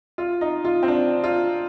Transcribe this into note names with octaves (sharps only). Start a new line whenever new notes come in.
F4
D#4
F4
C4
D4
F4